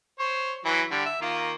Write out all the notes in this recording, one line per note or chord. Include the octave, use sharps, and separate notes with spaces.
C5 C#5
E3 F#3
D3 G3
E5
D#3 A#3 F4